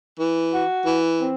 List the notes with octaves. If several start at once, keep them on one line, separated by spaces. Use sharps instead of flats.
E3
F#4
E3
C4